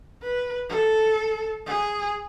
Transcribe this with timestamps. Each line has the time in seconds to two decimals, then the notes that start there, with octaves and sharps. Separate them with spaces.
0.22 B4
0.70 A4
1.66 G#4